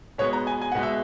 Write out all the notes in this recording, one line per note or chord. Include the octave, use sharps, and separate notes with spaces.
B2 G#3 B3 C#5
A#5
G#5
G#5
B2 G#3 B3 F#5
E5